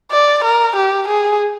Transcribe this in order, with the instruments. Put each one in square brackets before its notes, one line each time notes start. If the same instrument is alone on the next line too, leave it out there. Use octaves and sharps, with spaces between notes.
[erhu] D5
A#4
G4
G#4